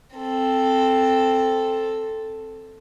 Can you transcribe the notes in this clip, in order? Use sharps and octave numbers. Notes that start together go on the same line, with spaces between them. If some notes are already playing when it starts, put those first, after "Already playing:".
C4 A4